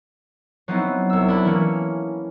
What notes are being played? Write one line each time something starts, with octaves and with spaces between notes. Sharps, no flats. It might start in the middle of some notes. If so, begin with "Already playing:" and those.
F#3 B3 C4 D#4 E4
C2 E6
D4 E4 B5
E3 A#3 C#4